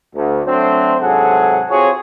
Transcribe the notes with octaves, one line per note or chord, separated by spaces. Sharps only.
D2
F#3 A3 C4 D4 C5
G#2 C3 F#3 G#4 A4 F#5
C4 F4 F#4 G#4 C#5